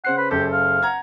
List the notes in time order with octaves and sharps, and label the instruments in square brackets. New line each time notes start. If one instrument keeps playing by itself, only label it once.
[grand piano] C#3 C5 C7 [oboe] F#5
[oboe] B4
[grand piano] F#1 C#3 A4 [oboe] G4
[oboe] F5
[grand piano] F#5 A#5 G#6